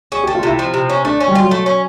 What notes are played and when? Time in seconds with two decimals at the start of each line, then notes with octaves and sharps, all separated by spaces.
0.12 C#4 G#4
0.24 A3 G4
0.35 F4
0.43 C3 E4
0.59 F3
0.74 C3
0.90 C#4
1.05 A3 D4
1.21 C#4
1.28 G3
1.35 F#3 F4
1.51 A3
1.66 C#4